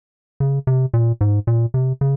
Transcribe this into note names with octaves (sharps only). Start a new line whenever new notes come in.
C#3
C3
A#2
G#2
A#2
C3
C#3